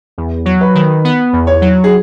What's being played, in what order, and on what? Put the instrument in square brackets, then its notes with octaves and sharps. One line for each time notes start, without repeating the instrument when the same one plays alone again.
[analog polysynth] E2
F#3
[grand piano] B4
[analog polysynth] D#3
B3
E2
[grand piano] C#5
[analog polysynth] F#3
[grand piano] G#4